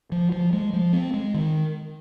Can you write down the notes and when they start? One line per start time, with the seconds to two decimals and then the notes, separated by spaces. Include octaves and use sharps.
0.12 F3
0.32 F3
0.53 G#3
0.73 F3
0.93 C4
1.14 G#3
1.34 D#3